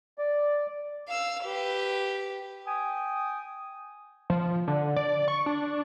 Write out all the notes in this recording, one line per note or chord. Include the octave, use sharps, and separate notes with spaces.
D5
F5 E6
G4 B4
G5 G#5 D#6
F3
D3
D5
C#6
D4